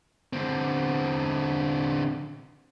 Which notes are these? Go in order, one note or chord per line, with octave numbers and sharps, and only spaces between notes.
D3 C4